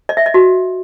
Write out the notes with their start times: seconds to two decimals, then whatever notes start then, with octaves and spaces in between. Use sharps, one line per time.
0.09 D#5
0.17 E5
0.26 D#5
0.34 F#4